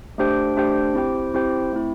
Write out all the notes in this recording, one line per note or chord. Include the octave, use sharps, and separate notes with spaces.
A3 D4 G4 C5 G5
A3 D4 G4 C5 G5
C4 E4 G4 C5 G5
C4 E4 G4 C5 G5
A3 C4 E4